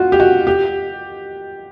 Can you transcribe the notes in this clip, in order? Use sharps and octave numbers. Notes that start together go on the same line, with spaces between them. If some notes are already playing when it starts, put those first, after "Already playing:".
Already playing: F4 F#4
G4
F#4
G4